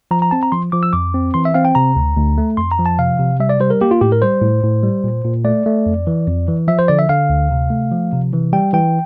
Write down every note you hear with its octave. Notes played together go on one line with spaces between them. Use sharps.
F3 A#5
A#5
C4 A5
A#5
F3 C6
F3 D6
E6
F2 D6
C4
E3 C6
E5
C4 F5
G5
C3 A#5
D2
D2
A3
F2 C6
A#5
F3
A5
C3 F5
C3
G3 E5
D5
G3 C5
A#4
A#3 G4
F4
A2 G4
A#4
G3 C5
A2
A2
G3
A#2
A#2
A3 D5
A3
F2
E3
F2
E3
F3 E5
C5
D3 D5
E5
D3 F5
D2
C3
A3
F3
C3
E3
G3 G5
E3 G5